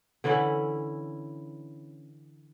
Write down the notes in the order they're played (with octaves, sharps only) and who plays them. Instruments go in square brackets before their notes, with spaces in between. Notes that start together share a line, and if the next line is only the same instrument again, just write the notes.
[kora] D3 E3 C#4 E4